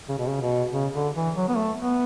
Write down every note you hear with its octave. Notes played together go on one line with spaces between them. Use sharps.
C#3
B2
C#3
B2
C#3
D3
E3
F#3
B3
A3
B3